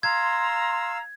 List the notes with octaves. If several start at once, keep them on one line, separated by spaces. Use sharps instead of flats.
F5 A#5 C6 E6 G#6